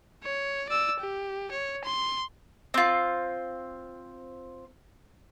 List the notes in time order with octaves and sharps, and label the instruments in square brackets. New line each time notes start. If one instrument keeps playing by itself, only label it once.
[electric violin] C#5
D5 E6
G4
C#5
C6
[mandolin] C4 F4